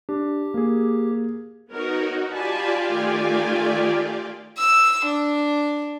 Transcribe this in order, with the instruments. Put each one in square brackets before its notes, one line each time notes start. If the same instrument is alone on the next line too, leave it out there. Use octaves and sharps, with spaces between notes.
[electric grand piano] D4 [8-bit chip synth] G4
[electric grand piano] A#3 G#4
[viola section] B3 A#4 C#5 [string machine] D#4 F#4
[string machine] F4 G4 D5 [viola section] G#5 A5 B5
[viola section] D#3 A3 G#5
[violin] E6
D4